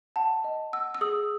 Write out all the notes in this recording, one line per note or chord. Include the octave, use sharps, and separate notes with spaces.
F#5 A5
D#5
F#5 E6
E6
G#4 D#6